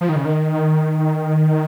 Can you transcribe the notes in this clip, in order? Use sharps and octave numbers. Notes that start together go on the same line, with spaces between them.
F3
D#3
C#3
D#3